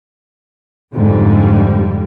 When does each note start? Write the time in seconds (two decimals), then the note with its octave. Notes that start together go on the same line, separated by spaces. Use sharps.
0.94 F2 G#2 D3 G3